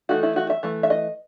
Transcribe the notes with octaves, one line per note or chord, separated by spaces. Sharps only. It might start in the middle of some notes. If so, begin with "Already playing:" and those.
E3 A3 D#4 F#4
E4
F#4
E5
E3 A3
E5
D#5